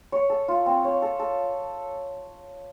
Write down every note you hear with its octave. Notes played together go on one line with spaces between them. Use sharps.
C#5
A4
F4
C4
C#5
A4
A4